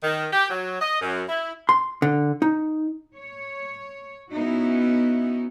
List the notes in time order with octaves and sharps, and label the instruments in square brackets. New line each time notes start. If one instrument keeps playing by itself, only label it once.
[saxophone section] D#3
G4
F#3
D#5
F#2
E4
[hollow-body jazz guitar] C6
D3
D#4
[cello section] C#5
B3 C#4 D#4 E4 F#4